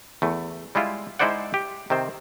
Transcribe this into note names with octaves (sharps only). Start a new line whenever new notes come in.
E2 A3
G3 G#3 E4 F4
G#3 D#4 E4 C5 D5 F#5
G4
C3 D#3 C4 C5